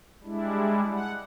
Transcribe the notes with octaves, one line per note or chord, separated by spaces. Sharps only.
G3 G#3 D4 E4
F#5